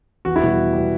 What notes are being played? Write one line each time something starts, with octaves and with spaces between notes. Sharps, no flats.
E2 F#4
E4
B2 G3 F#4
E2
B2 G3